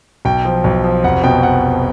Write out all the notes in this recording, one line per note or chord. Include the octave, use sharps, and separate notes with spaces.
B1 G5
F3
B1
F3
F1 F#5
B2 G5
F#5